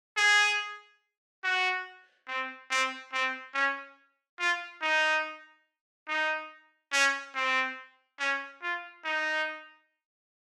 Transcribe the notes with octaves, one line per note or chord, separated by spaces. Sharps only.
G#4
F#4
C4
C4
C4
C#4
F4
D#4
D#4
C#4
C4
C#4
F4
D#4